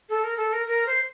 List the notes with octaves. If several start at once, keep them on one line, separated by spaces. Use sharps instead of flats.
A4
A#4
A4
A#4
A#4
C5